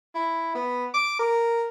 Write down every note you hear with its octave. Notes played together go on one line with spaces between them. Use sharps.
E4
B3
D6
A#4